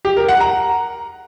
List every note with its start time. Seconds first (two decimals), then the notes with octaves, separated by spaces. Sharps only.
0.05 G4
0.17 A#4
0.29 F#5
0.40 A#5